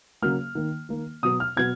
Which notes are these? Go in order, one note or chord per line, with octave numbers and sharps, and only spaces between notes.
C#3 F#3 A#3 F6
D#3 A#3
D#3 A#3
B2 F#3 B3 D#6
F6
B2 F#3 B3 G#6